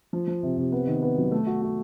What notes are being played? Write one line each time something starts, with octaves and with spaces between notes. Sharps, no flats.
F3
F3
C3
C3
B3
D#3
B3
F#3
A3
F#4
F#4